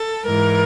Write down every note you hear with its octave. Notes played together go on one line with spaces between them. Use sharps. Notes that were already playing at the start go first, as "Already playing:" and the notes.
Already playing: A4
G#2 E3 A#4